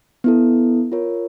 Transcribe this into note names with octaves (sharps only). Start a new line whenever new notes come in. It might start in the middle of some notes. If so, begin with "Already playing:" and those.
B3 E4 A4
F4 A#4 C#5